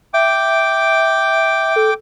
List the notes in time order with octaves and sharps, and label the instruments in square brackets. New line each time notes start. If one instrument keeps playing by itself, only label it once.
[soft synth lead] E5 [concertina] G5 D6
[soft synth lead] A4